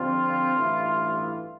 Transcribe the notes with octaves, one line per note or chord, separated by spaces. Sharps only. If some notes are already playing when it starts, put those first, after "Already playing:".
Already playing: F2 D3 G3 C4 F4
A1 G2 E3 A3 E4